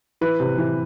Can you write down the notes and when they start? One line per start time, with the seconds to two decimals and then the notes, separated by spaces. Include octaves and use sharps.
0.21 E3 B4
0.40 C3
0.58 E3